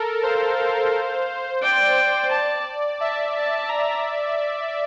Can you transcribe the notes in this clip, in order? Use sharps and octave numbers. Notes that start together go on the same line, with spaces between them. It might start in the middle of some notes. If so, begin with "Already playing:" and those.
Already playing: A4 A#4
C5 F5
D5 G5
A5
E5 A5
A5
A#5